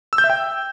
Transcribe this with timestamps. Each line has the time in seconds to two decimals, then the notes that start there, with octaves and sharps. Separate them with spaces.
0.13 E6
0.18 G6
0.24 E5
0.30 G5